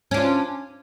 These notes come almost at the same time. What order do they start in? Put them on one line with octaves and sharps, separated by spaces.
C#4 D4 F4